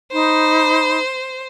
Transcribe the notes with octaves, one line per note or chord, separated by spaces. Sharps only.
D#4 C5 B5